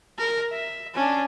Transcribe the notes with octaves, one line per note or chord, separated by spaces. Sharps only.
A#4
E5
C#4 D4